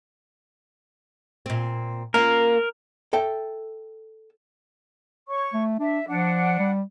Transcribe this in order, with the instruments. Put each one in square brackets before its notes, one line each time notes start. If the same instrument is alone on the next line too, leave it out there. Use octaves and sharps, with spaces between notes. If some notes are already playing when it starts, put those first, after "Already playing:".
[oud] A#2 C4
[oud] A#3 C#4 F4 [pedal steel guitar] A#4
[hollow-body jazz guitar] A4 E5 G5
[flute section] C#5 C#6
[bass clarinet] A3
[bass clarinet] D4 [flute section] E5
[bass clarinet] F3 [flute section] D4 F#5
[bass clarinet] G3